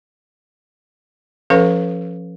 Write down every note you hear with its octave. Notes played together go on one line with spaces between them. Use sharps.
F3 C#4 A4 B4 F5 C#6